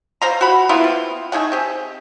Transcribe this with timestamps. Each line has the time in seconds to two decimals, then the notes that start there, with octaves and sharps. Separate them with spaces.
0.22 C5 F5 A#5
0.41 F#4 B5
0.69 A#3 B3 E4 F4
0.84 C4
1.32 A3 D#4 G#4 F#5
1.52 C4 G4 G#4